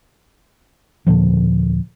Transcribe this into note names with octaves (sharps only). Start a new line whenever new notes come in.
D#2 A#2 D3 F3